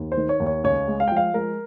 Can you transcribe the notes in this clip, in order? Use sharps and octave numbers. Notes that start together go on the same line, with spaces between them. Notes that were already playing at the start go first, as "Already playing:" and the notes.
Already playing: D#2
C5
D#3
C#5
D#2
C#5
C#2 C#5
G#3
F5
G5
F3
F5
G#3 A#4